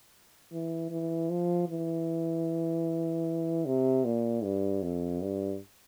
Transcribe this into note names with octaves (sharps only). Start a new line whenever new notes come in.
E3
E3
F3
E3
C3
A#2
G2
F2
G2